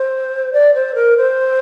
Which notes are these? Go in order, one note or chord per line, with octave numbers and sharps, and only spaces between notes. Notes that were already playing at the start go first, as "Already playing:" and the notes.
Already playing: C5
D5
C5
A#4
C5